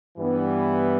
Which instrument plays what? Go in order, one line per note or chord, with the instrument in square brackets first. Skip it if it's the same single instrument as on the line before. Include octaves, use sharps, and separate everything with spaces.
[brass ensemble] G2 E3 G3 B3